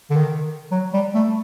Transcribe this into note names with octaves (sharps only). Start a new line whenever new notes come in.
D3
D#3
F#3
G3
A3